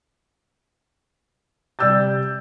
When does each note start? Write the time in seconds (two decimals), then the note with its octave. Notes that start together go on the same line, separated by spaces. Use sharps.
1.79 C3 G3 D5 E6 G6 A6